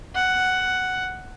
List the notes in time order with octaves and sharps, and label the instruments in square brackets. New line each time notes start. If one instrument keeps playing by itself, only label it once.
[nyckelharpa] F#5